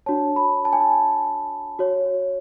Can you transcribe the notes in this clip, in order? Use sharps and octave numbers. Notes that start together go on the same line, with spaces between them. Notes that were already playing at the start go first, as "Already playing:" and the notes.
D4 F#4 C#5 A5
B5
A5
G#5
A5
F#4 C#5